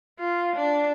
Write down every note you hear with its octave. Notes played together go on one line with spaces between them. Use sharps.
F4
D4